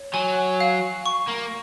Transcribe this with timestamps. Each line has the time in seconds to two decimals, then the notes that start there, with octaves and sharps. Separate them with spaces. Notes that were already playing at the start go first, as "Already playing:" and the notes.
Already playing: C#5
0.14 F#3 G#5
0.60 F5
1.06 C#6
1.28 A#3